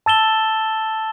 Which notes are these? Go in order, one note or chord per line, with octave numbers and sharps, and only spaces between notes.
A5 E6 A6 E7 G7